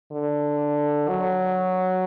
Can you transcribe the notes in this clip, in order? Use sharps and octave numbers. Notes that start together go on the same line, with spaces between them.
D3
F#3